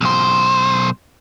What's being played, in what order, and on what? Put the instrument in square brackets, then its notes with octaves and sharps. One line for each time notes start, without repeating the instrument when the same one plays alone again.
[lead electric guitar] B1 C5